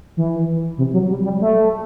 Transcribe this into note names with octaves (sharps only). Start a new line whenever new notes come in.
E3
C3
F#3
G3
G3
A3